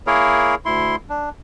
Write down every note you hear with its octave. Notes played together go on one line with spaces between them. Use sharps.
A#3 E4 G#4 A#4 C#5
D2 E4 C6
D4